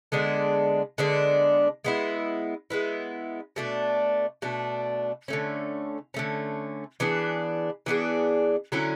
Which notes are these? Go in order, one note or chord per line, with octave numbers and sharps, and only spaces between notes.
D3 G#3 B3 D4
D3 G#3 B3 D4
G#3 B3 E4
G#3 B3 E4
B2 A3 D4
B2 A3 D4
D3 A3 C#4
D3 A3 C#4
E3 B3 D4 G#4
E3 B3 D4 G#4
D3 F#3 C#4 E4